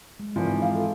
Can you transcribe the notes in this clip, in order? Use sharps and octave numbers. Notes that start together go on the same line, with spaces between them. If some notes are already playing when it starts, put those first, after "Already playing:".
G#3
G#1 E3 F3
G#3 D#4 E4
F5
F4 A4